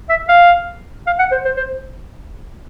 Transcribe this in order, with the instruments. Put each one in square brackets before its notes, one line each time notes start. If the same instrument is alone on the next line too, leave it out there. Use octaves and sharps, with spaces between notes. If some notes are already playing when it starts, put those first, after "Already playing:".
[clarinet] E5
F5
F5
F#5
C5
C5
C5